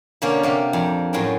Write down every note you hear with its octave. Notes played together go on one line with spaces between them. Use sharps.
B2 D3 A#3 C#4 D4
C3 A#3 G4
F2 A#2
F#2 A2 F#4 G#4 C5 G5